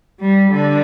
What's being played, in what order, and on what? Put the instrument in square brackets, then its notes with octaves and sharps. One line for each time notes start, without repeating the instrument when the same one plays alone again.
[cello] G3
D3